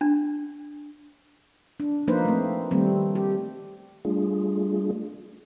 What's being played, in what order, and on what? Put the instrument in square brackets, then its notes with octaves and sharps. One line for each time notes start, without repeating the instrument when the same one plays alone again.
[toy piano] D4
[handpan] D4
F3 A#3 D#4 B4 C5
A3 C4
D#3 G3 A3 C4
G4
[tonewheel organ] G3 A3 D4 F4 G#4